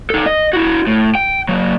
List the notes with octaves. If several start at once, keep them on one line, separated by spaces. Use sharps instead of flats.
D#4 A4
D#5
E4 F#4
A2
G5
F#3 A#3